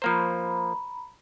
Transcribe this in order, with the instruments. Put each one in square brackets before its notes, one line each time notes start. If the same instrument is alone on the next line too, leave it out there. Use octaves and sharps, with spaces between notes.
[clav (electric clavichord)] F3 A#3 C5 [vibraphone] A#5 B5